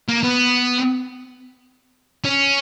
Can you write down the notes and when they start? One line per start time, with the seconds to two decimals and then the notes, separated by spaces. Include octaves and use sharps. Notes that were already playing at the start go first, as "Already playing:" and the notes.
0.08 A#3
0.23 B3
2.24 C#4